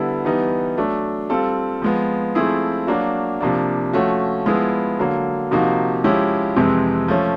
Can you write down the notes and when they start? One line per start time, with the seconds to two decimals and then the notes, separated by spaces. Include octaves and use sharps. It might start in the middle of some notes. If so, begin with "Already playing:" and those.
Already playing: D3 G3 B3 E4
0.25 E3 G3 B3 D#4
0.77 F#3 A3 D4
1.30 G3 C4 F4 A4
1.82 F3 G#3 B3
2.35 F3 A3 C4 E4 G#4
2.87 F#3 A#3 D4 F#4
3.41 C3 F3 A#3 D4
3.93 F3 A3 C#4 F#4
4.46 F3 G#3 B3 E4 G#4
4.99 D3 F#3 A#3
5.51 C3 F3 A#3 D#4 F#4
6.04 F3 G#3 C#4 E4 G4
6.56 F2 C3 E3 G#3 C4
7.08 F3 A3 C#4